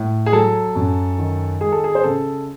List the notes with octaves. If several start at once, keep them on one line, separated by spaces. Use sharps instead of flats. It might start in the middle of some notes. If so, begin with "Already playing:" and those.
Already playing: A2
G#4
F#3 A4
F#2
D#3
G#3 G#4
A4
G#4
C5
C#3 A4